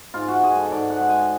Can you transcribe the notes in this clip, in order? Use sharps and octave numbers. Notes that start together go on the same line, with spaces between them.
G#2 F4
F#4
G#3 G#4
A4
G#2 D5
F#5
G#3
G#5